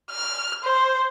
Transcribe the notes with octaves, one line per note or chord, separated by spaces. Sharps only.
F6
C5